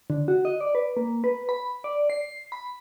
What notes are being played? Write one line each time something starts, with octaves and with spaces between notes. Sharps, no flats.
D3
F#4
D#5
D5
B4
A#3
B4
B5
D5
C7
B5